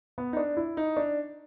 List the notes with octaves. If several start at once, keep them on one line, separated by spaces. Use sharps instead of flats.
B3
D#4
D4
E4
D#4
D4